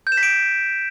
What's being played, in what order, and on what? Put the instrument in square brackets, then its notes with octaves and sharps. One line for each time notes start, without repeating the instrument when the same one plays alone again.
[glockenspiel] G6
E7
B6
D7